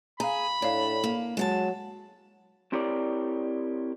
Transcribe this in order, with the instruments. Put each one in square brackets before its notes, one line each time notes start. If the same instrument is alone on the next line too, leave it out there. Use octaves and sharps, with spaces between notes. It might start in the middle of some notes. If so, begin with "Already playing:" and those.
[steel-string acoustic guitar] G#4 [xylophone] F5 G#5 A#5 [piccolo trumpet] B5
[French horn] A2 [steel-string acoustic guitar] D4 [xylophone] C#5 D5 F5
[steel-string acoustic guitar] A#3
[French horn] F#3 [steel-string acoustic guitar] G#3 F#5 A5
[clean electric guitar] C4 E4 G4 A#4 C#5 D5